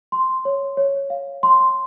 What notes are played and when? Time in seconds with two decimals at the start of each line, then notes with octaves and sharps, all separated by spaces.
0.12 C6
0.45 C#5
0.77 C#5
1.10 F5
1.43 C6